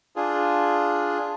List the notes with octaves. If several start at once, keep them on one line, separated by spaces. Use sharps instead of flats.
D4 F4 G#4